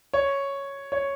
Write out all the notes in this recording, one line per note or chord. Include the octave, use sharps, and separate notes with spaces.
C#5
C#5